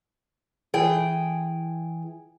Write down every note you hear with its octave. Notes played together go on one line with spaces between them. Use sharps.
E3 G#4 G5